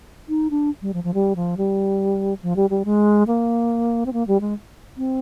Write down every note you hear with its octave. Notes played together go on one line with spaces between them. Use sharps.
D#4
D4
G3
F3
F3
G3
F3
G3
F3
G3
G3
G#3
A#3
C4
A#3
G3
G#3
C4